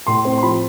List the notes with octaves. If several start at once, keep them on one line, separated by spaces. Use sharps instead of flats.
A2 C6
C4
C6
F3 B5